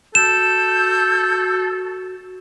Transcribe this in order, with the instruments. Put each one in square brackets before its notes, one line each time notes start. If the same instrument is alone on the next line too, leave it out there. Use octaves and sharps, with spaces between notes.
[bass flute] F#4 [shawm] A4 [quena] G6 [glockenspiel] E7